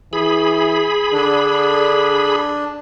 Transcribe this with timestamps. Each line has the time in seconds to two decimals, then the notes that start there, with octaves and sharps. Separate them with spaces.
0.13 E3 G#4 B5
1.13 D3 D4